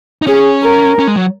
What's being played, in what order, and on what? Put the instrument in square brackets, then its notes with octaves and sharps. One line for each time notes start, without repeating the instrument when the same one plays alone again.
[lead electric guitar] D#4
[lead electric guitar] C#4 [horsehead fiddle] G#4
[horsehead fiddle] A#4
[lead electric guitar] C#4
G#3
F#3